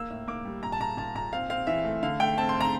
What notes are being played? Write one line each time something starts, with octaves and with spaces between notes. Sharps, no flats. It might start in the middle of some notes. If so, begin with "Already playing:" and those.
Already playing: A#3 E6
A2
A#3 D6
G3
A#2 A#5
A5
A#2 A#5
A#2 A5
A#2 A#5
C4 F5
C4 F5
E3 E5
A3
D3 F5
A3 G5
C4 A5
C6
C4
A#5